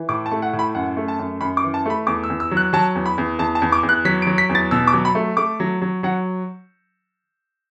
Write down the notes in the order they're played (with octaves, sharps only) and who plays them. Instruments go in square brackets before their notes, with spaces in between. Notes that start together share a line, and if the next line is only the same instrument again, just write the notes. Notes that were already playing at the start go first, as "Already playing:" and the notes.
Already playing: [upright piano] E3
A2 D6
A5
A3
F#5
A2
B5
F#2 F#5
A3
A5
F#2
F#2 B5
D6
E3
A5
A3 B5
E2 D6
E6
E2
E6
F#3
F#6
F#3 A5
E2
B5
E2
E2 A5
A5
E2
D6
E2
F#6
F#3 B6
D7
F#3
B6
E2
A6
B2 E6
D6
F#3
B5
A3
A3 D6
F#3
F#3
F#3 F#5